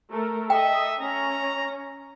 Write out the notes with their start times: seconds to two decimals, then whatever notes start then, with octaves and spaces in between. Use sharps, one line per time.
0.11 A3 A4 A#4
0.50 A4 D#5 E5 G5
1.00 C#4 A#5